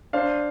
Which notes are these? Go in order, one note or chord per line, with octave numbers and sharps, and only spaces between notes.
D4 C5 F5